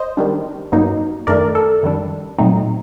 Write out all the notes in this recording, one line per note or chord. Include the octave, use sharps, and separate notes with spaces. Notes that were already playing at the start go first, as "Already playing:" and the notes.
Already playing: C5 D#5
D#3 G3 D4
G2 F#3 A#3 D#4
F#2 D#3 A3 D4 A#4 D5
A4
F#2 D#3 G3 D4
A#2 F#3 A3 C4 D#4